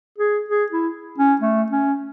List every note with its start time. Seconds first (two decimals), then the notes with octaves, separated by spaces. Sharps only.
0.18 G#4
0.49 G#4
0.72 E4
1.18 C#4
1.41 A3
1.72 C#4